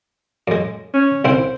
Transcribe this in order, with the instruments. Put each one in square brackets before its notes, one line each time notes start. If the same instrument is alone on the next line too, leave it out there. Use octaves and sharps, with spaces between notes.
[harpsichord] F#2 G#3
[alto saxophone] C#4
[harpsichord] C2 C4 E4 [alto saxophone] C5